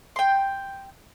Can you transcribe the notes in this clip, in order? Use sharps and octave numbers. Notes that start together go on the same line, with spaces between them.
G5 C6